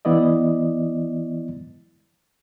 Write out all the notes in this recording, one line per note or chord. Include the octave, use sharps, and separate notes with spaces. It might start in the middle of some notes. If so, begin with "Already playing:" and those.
E3 B3 E4 D5 D#5